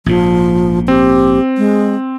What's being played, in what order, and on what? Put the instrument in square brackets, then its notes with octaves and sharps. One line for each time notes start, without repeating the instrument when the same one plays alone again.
[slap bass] A#1 G#2 [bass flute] F3
[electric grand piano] C4 [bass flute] G4
[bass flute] G#3